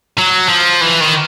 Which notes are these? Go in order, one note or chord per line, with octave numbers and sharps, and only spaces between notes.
F#3
F3
E3
D#3